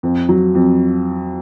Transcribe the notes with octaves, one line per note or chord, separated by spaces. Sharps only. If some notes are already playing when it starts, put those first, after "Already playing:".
F2
F#3
F2